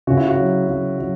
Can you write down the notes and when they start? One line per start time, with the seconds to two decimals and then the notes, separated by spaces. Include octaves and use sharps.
0.07 C#3 F#4
0.17 E4
0.27 F#4
0.37 F#3
0.68 F#3
0.99 F#3